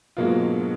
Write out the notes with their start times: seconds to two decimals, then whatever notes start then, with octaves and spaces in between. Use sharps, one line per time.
0.17 G#2 B2 F#3 A#3 F4
0.43 D3